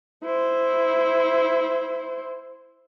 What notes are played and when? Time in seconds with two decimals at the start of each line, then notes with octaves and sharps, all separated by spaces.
0.23 E4 C5